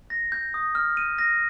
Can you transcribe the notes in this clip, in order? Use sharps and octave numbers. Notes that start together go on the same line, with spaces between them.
A#6
G6
D#6
F6
D#7
A#6